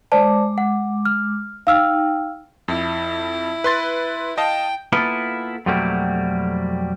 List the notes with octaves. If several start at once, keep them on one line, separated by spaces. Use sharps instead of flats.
G#3 C5 D5 A5 D6
F#5
F6
D#4 F5 G5 E6 F6
F2 E4
B4 C6 A6
D#5 F5 G5 A5
A#3 B3 E4 F4 A4
F2 B2 F#3 G3 A3 A#3